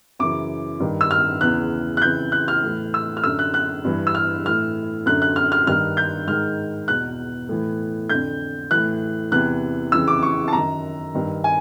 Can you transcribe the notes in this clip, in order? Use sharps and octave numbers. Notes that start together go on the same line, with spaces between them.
F#2 C#3 E3 D6
G2 D#3
E6
F6
E2 C#3 E3 F#6
F#6
F2 C#3 E3 G6
F#6
F6
A2 E3
E6
F6
F#2 D3 E6
F#6
F#6
G2 E3
E6
F6
A2 E3 F6
F#2 D3 F#6
F#6
F6
F6
G2 D#3 F6
G6
G#2 D#3 F6
E2 B2 F#6
A2 E3
F2 D3 G6
A2 E3 F#6
E2 C3 E3 F#6
F2 C#3 E3 E6
D6
C#6
A5
F#2 D#3 A#5
G2 D#3
G#5